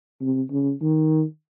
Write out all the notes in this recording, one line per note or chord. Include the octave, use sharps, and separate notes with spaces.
C3
C#3
D#3